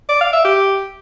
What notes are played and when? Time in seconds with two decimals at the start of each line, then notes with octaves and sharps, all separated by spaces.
0.09 D5
0.21 F5
0.33 E5
0.45 G4